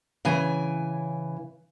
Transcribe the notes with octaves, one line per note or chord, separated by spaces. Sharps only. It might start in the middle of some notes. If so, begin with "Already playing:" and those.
C#3 E3 G#5